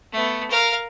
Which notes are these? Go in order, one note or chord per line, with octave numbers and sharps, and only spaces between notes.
A3 B3
A#4 F5